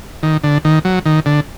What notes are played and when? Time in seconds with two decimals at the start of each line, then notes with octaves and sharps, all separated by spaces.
0.23 D#3
0.44 D3
0.65 D#3
0.85 F#3
1.06 D#3
1.26 D3